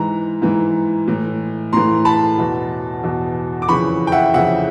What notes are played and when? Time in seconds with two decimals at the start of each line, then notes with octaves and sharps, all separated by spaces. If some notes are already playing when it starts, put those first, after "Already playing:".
Already playing: G#2 E3 A#5
0.42 G#2 E3
1.07 A2 E3
1.73 A2 E3 A#5 C6
2.05 A5 B5
2.38 E2 B2
3.04 E2 B2
3.62 D6
3.68 F2 C#3 E3 B5 C#6
4.07 G5
4.12 E5 F#5
4.34 F2 C#3 E3 E5 F#5